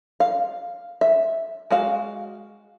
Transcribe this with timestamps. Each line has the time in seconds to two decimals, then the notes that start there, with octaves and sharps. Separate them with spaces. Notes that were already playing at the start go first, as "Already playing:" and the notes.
0.20 F5
1.01 E5
1.70 G#3 F#4 F5